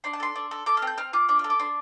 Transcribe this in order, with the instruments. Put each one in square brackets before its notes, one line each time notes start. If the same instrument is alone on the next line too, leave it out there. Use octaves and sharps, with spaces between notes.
[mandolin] D4 C6
A5
A4 C6
D4
A4
A4 D6
F6
C4
G6
C4 F6
F4 D6
D4 D6
F6
A4
D6
D4 C6